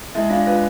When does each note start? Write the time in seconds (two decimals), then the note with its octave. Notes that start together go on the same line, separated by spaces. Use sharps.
0.15 G#3 E4 E5
0.30 D4 F4 F5
0.46 F4 B4 F5